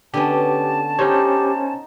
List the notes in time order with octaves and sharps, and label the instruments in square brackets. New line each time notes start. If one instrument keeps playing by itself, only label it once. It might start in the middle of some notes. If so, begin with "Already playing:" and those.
[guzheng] D3 B3 C#4 [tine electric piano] G4 [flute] A5
[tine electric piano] C#4 C5 C#5 [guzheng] D#4 [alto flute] G4